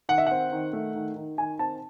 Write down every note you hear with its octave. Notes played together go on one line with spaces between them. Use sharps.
D#3 F#5
E5
C4 F#5
D#3
A3
D#3
D#3
D#3 G#5
C4 A5